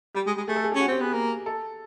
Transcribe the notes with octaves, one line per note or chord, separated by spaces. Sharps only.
G3 G4
G#3
G#3
A3 G#4
A4
G#4
G4
C#4
F#4
C4 G4
B3 G#4
A#3
A4